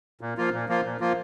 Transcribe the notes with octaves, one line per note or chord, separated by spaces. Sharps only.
A#2
F3 A#3 F4
A#2
F3 A#3 F4
A#2
F3 A#3 F4